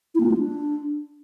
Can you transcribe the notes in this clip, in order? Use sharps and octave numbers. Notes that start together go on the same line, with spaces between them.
E4
A#3
F4
A3
D4